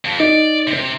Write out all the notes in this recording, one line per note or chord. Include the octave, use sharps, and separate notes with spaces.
F2
D#4 D5
C3